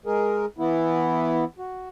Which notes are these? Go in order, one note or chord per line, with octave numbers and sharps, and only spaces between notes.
G#3 G#4 A#4
E3 B3 E4
F#4